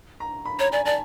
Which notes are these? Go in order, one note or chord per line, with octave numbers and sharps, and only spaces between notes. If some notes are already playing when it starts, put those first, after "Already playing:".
A#5
B5
C#5 A#5
D5 G#5
D5 A5